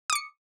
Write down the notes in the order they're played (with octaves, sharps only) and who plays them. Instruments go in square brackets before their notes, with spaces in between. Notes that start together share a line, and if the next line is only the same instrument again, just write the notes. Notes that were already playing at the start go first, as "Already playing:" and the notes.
[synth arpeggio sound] D#6
D6
C#7